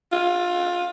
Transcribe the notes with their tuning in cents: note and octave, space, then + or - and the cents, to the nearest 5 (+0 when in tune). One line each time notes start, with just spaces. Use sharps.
F4 +20